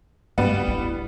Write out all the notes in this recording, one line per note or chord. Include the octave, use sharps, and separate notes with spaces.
G2 G3 B3
E4